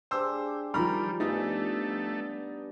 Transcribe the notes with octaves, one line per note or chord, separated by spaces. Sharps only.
D4 G4 G#4 C5 E6
D#3 F3 G3 A#5 B5 F6
G2 A3 B3 D#4 G#5